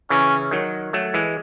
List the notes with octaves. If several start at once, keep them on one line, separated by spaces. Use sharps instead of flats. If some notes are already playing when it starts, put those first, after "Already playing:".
C#3 E3 C#4
D#3 F#3
F#3 A3
E3 G#3